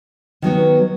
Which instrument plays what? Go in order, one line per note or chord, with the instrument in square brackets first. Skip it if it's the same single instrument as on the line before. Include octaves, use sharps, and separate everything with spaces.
[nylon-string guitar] D#3 F#3 B3 F#4